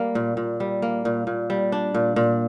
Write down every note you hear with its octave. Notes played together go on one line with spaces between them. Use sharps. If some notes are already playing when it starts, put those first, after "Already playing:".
Already playing: G3 A#3
A#2
A#2
G3
A#3
A#2
A#2
G3
D4
A#2
A#2